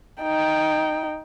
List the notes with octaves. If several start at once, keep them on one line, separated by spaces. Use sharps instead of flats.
D#4 G5